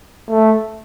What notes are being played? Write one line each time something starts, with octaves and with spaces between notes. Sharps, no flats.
A3